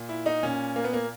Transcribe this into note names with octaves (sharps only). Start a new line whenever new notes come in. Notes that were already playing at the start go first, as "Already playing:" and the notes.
Already playing: A#2
E4
D#4
A#2 C#4
A#3
B3
A#3